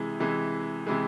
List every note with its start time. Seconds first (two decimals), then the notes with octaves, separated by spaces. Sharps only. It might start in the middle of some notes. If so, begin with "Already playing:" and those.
Already playing: C3 E3 G#3
0.20 C3 E3 G#3
0.87 C3 E3 G#3